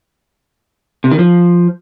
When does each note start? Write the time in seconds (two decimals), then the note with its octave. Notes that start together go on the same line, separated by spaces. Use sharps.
1.04 C3
1.12 D#3
1.19 F3